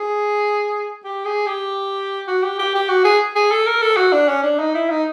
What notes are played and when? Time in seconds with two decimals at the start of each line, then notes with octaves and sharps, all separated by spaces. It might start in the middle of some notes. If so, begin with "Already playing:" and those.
Already playing: G#4
1.05 G4
1.25 G#4
1.46 G4
2.28 F#4
2.43 G4
2.59 G4
2.75 G4
2.89 F#4
3.05 G#4
3.36 G#4
3.51 A4
3.67 A#4
3.82 A4
3.97 F#4
4.12 D4
4.28 C#4
4.43 D4
4.59 D#4
4.74 E4
4.90 D#4